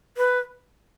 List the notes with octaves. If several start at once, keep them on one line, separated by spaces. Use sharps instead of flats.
B4